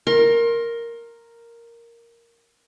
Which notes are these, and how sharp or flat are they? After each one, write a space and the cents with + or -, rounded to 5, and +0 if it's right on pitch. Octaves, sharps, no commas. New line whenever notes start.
A#4 +0 C6 +35